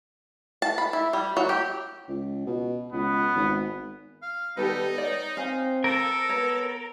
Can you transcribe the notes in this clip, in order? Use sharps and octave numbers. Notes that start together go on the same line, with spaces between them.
A5
B5
E4
G3
F#3
G4
C#2
B2
C#2 B3
G#1
F5
D#3 G3 B3 D#4 G4 A4 B4
B4 C#5 D5
C4 F5 G#5
A4 A#4
B3 B4 C#5